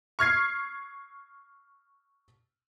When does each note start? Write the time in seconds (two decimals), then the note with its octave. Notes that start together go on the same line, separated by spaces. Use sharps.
0.19 C#6 F6 G#6 C7